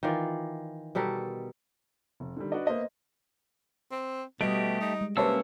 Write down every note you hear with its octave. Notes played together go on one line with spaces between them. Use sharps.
D#3 E3 F4 D5
B2 G3 A4 A#4
F1
D3 D#3 G3
D4 F#4 B4 D5 D#5
A#3 B3 C5 D#5 E5
C4
B2 G3 A3 G4 D#5 D7
D#4
G#3
C3 A#3 C#4 B4 C#5 A5 E6